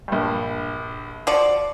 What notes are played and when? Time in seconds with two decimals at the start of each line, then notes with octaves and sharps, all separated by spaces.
0.08 A#1 G2
1.27 F3 F#4 D5